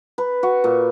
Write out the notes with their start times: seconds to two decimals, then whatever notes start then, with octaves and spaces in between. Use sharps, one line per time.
0.18 B4
0.43 F#4
0.64 A#2